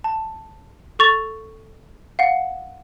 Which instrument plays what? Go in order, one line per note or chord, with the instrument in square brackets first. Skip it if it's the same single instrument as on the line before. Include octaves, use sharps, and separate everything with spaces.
[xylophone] A5
A4 C#6 A6 F7
F5 F#5